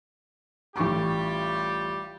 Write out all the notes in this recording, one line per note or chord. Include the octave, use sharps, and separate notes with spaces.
A1 G3 F4 G4 C#6 D6